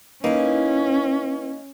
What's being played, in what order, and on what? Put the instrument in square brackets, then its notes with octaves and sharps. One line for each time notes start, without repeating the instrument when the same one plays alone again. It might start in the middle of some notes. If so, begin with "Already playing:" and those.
[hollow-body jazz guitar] A#3 D#4 [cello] C#4 [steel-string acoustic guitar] E4 B4